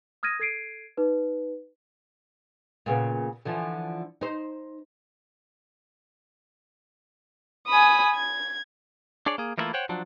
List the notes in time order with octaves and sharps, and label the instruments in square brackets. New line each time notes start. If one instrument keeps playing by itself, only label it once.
[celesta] D#6 F6 G#6 A#6 D#7
A4 G#6 C7 D7 D#7
D#4 B4
[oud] A#2 C#3 B3
D3 E3 F3
D#4 C5
[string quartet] G#5 B5 D#6
G#6
[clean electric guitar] D4 G#4 C#5 D5
A#3 G#4
E3 G3 A3 A#3 E4 F4
C5 C#5 F#5 G5
F3 F#3 D4